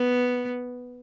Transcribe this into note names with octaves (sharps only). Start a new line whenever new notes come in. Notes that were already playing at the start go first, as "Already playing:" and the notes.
Already playing: B3